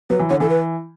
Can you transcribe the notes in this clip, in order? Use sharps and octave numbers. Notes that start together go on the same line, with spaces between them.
F#3 B4
E3
D3 C#5
E3 A4
B4